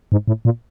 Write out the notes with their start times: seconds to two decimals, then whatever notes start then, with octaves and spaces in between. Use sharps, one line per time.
0.12 G#2
0.28 A2
0.45 A#2